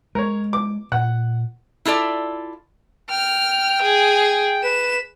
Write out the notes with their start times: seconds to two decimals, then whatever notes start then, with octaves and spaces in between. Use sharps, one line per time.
0.15 G#3 A#4 C#5
0.53 D6
0.92 A#2 F#5
1.85 E4 F4 A4 D5
3.10 G5 F6
3.82 G#4
4.64 B4 E7